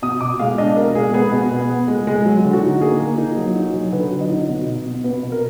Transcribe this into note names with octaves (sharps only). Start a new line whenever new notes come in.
B2 D#6
B2 D6
G#3 F5
D4 D#5
B2 A#4
G#3 G#4
B3 G#4
B2
B3
B3
G#3
G#3
F#3
D3
F#4
D#4
A#3 G#4
A#3
D#4
F#3
D#4
F#3
D3 B4
F#3
D#5
D#4
B2
B2
B2
B2 B4
B2
A#4